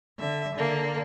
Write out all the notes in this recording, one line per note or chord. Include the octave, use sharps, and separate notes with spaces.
D3 E5
D3 A#3